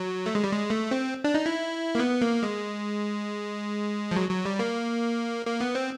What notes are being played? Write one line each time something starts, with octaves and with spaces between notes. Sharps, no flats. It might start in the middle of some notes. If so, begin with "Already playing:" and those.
Already playing: F#3
A3
G#3
G3
G#3
A3
C4
D4
D#4
E4
A#3
B3
A#3
G#3
F3
F#3
F#3
G3
A#3
A#3
B3
C4